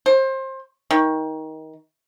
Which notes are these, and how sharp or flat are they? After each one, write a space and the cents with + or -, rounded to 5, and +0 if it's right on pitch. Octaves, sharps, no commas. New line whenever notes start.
C5 +25
D#3 +20